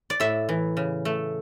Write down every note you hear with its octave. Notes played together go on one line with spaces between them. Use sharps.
D5
A2 E5
E3
C#3
A3